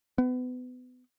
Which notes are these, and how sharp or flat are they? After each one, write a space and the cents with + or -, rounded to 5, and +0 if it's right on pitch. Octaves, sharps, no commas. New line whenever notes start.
B3 +30